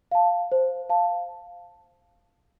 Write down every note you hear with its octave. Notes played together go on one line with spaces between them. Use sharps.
F5 A5
C5
F5 A5